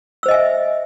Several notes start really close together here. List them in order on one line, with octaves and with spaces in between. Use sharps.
E6 C5 D#5 G#5 E5